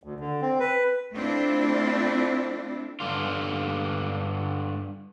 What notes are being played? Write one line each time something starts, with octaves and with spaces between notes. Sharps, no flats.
D2
D3
C4
B4
A3 C4 D4 E4 F4
G2 D3 F4